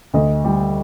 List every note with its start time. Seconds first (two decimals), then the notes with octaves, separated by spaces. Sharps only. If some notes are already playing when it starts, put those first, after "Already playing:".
0.14 D2 D#5
0.44 G3